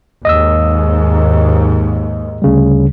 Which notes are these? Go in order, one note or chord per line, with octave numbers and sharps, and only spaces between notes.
D#2 G#2 D#5 D#6 E6
D2 C#3 G3